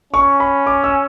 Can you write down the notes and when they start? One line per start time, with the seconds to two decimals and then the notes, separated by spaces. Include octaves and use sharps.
0.13 C#4 C#6
0.40 B5
0.67 D6
0.84 E6